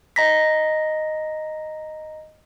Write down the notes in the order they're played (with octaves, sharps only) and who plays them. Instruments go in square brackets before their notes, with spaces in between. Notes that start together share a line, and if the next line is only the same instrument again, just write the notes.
[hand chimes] D#5 A#5 A#6 B6